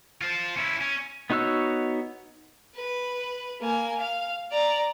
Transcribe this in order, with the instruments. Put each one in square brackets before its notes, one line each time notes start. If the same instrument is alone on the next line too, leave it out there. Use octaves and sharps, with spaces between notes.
[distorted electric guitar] F4 C5
C#4 E4
C#4
[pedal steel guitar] B3 D#4 F#4 C#5 E6
[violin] B4
A#3 G#5
F5
D5 A#5